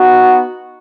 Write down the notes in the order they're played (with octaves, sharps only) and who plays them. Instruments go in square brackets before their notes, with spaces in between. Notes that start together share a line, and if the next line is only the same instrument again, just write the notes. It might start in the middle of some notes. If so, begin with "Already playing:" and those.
Already playing: [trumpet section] B3 D#4 F#4